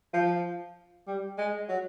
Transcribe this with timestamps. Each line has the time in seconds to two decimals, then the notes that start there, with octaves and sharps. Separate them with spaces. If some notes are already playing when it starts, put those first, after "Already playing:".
0.14 F3
1.07 G3
1.38 G#3
1.69 F#3